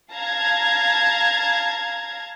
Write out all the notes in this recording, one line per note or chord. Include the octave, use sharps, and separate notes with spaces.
F5 A5 A#5 G#6